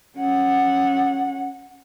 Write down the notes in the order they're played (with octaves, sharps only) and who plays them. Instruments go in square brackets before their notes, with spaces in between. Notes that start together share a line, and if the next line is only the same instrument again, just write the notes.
[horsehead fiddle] C#4 F#5